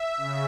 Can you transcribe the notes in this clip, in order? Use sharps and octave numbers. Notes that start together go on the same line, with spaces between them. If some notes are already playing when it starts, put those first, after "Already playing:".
Already playing: E5
C#3